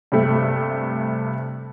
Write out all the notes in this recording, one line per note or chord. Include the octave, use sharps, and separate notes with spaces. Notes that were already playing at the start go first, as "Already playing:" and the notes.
G2 C3 A3